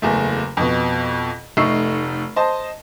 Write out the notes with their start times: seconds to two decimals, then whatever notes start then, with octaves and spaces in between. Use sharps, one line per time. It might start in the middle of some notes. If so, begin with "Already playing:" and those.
0.02 F#1 E2 A3
0.57 F2 B2
1.57 F1 A3 D#4 C#6 E6 C7
2.36 C5 D#5 A5